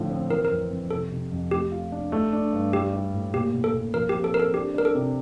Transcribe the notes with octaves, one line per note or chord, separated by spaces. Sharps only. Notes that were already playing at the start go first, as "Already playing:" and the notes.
Already playing: A2 D3 F3
C4
E3 A#4
A#4
F2
F2
C3 A4
C3
F2
A3 G4
F4
D4
A3
D4
G2
G3 G4
G3
A2
A#2 G4
A#2
A4
A#2
F3 A#4
C4 G4
A4
C4 A#4
A4
D4 G4
D4 A#4
A4
C3